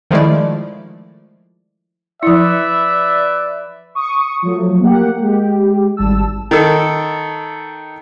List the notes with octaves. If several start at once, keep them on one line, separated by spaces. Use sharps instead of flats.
D#3 F3 G#3 A3 E4 D5
F3 E4 B4 D5 E5
C#6 D#6
F3 F#3 A3
A#3 G4 F#5
G#3 G4
G#1 G3 A5 E6
D#3 A4